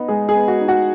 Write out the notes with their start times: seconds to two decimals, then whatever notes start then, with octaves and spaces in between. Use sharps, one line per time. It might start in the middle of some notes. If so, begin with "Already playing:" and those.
Already playing: B3 D#4
0.08 G#3 G#4
0.29 G#4
0.36 B3
0.48 F#4
0.61 D#4
0.68 F#4 F#5